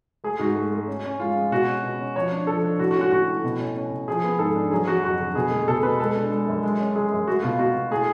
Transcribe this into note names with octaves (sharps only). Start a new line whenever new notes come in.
A3 G#4
G#2 F#4
A3
A3
C#4
C#4
G#3 F4
G#3
B2 F#4
C#4
B2
C#4
F3 C#5
D4
F3 A4
D4
A2 F#4
F#4
C#4
F#4
A2 F#4
A2
B2
C#4
C#4
B2
F3 G#4
B3
G#2 A4
D4
F#3 G#4
F#3 F#4
F2 F#4
D3
B2 G#4
A3
B2 A4
B2 B4
G#3 A4
D4
G#3
F#2
G#3
C#4
G#3 G#4
F#2
A3 F#4
B2 F4
B2 F#4
B2
A2 G#4